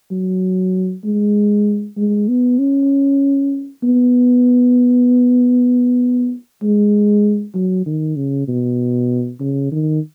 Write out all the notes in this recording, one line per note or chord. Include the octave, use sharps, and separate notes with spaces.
F#3
G#3
G#3
B3
C#4
B3
G#3
F#3
D#3
C#3
B2
C#3
D#3